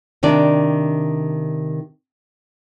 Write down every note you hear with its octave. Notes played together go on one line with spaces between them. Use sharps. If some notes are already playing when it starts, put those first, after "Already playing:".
C3 D#3 D4 D5